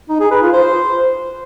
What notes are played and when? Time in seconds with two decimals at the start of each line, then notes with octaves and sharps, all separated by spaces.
0.09 D#4
0.20 G#4
0.31 B4
0.42 F4
0.53 C5